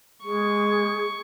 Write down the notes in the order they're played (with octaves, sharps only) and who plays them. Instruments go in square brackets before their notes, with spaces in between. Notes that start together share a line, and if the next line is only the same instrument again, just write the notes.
[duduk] G#3 [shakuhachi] G#4 [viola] C#6